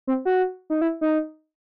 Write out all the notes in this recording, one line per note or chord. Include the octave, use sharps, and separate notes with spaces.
C4
F#4
D#4
E4
D#4